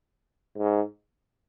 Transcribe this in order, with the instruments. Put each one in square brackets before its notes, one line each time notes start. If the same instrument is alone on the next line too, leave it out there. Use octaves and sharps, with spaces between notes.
[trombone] G#2